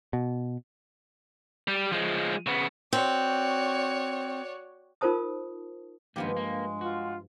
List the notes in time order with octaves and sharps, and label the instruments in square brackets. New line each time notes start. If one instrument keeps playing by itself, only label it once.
[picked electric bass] B2
[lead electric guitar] G3
F3 G#3
C#3 B3
[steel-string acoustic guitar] C4 [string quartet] F#4 C#5 D5
[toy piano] D#4 F4 A#4 C5 A5 D#6
[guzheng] G2 F3 G4 [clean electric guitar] D#3 A#3 B3 [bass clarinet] G#3
[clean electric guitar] A#3
[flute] F4 [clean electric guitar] F#4